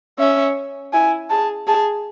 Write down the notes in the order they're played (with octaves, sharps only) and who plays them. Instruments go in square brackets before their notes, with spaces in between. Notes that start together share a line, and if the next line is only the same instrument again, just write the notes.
[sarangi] C#4 [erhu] E5
[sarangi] E4 [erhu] G#5
[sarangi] G#4 [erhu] A5
[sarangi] G#4 [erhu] A5